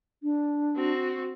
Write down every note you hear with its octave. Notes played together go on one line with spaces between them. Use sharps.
D4
C4 F#4